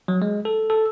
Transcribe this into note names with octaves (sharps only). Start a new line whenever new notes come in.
F#3
G#3
A4
A4